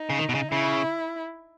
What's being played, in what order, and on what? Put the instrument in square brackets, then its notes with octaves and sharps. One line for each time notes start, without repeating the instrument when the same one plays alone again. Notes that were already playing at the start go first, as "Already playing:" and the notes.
Already playing: [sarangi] D#4
[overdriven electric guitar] C#3
D#3
B2
C#3
[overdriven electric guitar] C#3 [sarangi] E4